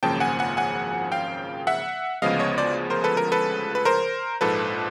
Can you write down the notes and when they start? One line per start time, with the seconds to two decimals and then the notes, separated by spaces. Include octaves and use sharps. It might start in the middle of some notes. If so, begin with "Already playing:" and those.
0.03 G#1 F#2 C#3 F3 A#3 G5 A5
0.20 F#5 G#5
0.39 F#5 G#5
0.57 F#5 G#5
1.12 F5 G5
1.67 E5 F#5
2.22 D2 C#3 F3 G#3 B3 D#5 F5
2.39 C#5 D#5
2.58 C5 D5
2.90 A#4 C5
3.04 A4 B4
3.17 A#4
3.32 A4 B4
3.75 B4
3.85 A#4 C5
4.41 A#1 G#2 F3 A4 B4